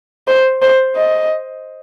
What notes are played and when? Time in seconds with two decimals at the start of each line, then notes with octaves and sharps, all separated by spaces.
0.28 C5
0.62 C5
0.97 D#5